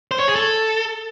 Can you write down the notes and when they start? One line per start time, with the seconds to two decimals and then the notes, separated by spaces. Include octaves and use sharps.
0.11 C5
0.20 C#5
0.28 G#4
0.36 A4